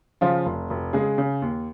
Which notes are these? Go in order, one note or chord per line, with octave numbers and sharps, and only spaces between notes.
C#3 F3 F4
F1
F1
C#3 G#3 G#4
C#3
D#2